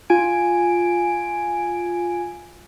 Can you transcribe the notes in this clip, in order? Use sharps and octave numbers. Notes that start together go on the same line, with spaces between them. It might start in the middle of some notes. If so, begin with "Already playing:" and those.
F4 G#5 D7